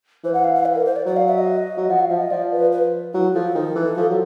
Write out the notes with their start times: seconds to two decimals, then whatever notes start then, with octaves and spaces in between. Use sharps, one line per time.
0.24 E3 C5
0.34 F#5
0.44 F5
0.55 F5
0.65 B4
0.75 A#4
0.85 C5
0.96 D5
1.06 F#3 D5
1.16 F5
1.28 E5
1.38 D#5
1.77 F#3
1.89 F3 F#5
2.00 F5
2.10 F3 E5
2.20 D#5
2.31 F3 D5
2.52 B4
2.72 B4
3.14 F#3 E4
3.34 F3 A4
3.55 D#3
3.76 E3
3.97 F3
4.09 F#3